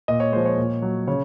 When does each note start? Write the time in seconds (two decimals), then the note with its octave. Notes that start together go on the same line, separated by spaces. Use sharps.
0.08 A#2 D#5
0.20 C#5
0.32 F3 G#3 C5
0.46 C#5
0.57 A#2
0.82 F#3
1.07 C#3 C#5